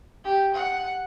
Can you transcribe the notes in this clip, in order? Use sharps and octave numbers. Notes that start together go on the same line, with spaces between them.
G4
F#5